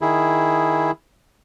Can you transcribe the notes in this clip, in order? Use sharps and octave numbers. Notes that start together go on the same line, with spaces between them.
D#3 E4 G#4